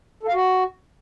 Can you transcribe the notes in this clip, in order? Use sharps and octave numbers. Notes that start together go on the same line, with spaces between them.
A4
F5
F#4